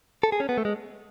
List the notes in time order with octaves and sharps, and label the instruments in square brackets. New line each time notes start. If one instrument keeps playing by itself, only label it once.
[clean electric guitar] A4
G#4
C#4
B3
A3
G#3